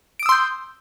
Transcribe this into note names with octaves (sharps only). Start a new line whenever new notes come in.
C6 D#6 E6 G6 D7